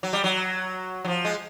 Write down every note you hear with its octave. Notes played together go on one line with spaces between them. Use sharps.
F#3
G3
F#3
F#3
F3
G#3